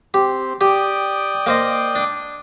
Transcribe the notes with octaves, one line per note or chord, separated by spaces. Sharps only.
C4 G4
G4 D5 G5 D#6
A#3 C5 D#5
D4